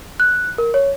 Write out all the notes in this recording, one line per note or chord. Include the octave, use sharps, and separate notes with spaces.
F#6
A#4
C#5